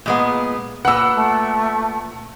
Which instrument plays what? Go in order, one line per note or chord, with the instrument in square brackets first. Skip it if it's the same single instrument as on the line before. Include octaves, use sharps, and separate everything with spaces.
[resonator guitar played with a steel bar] A#2 G#3 B3
[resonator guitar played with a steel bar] A#2 B4 [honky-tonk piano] F#5 E6
[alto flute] A3